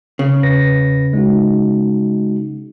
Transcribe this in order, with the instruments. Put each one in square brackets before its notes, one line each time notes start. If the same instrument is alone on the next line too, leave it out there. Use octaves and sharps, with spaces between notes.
[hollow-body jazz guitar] C#3
[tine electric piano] E2 B4 A#6
G#3 D#4 F#4